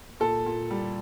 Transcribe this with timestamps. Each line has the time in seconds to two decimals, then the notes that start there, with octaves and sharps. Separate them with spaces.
0.20 A#2 A4
0.46 A#2
0.70 G3